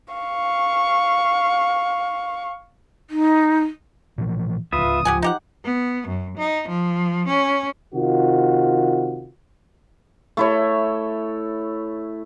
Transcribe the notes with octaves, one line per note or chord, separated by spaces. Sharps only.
F5 C#6
D#4
A#2 E3 F3
D1 C#2 F4 B4 E5 D#6
F3 G4 F#5 G#5
D#4 G4 F#5
B3
F#2
D#4
F3
C#4
C3 D#3 F4 F#4
A3 E4 C#5